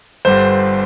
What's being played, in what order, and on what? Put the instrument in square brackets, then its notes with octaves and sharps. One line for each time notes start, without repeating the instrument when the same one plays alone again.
[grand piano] G1 G2 D3 C5